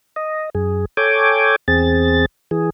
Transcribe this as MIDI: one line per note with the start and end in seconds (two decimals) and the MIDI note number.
0.16 0.50 75
0.55 0.85 42
0.55 0.85 68
0.97 1.56 69
0.97 1.56 73
0.97 1.56 79
0.97 1.56 80
0.97 1.56 86
1.68 2.26 40
1.68 2.26 60
1.68 2.26 68
1.68 2.26 93
2.51 2.70 52
2.51 2.70 68